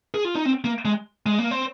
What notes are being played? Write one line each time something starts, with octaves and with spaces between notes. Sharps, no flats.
G#4
F4
D#4
C4
A#3
G#3
G#3
A#3
C4